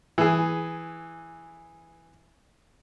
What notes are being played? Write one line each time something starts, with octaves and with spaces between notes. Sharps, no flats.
E3 G#4